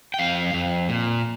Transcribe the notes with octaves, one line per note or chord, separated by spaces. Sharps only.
G5
F2 F5
F2
A#2